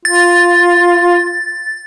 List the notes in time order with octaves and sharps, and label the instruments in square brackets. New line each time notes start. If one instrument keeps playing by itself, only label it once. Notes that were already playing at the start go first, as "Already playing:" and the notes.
[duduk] F4 [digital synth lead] A6